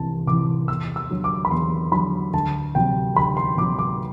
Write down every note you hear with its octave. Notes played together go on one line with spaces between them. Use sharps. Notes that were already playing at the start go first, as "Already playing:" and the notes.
Already playing: C2 C3 E3 A5
C3 E3 D6
E2 E6
E6
D3 F#3
D6
B5
E2 C6
D3 F#3 B5
D2 A5
C3 F#3 G5
D2 B5
C6
C3 F#3 D6
D6